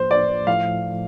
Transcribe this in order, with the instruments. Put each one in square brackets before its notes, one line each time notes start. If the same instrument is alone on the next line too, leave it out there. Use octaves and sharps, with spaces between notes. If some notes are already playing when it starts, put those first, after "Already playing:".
Already playing: [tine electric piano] A2 F3 A#3 F4 [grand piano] C5
[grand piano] D5
[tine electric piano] A2 F3 A3 [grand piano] F5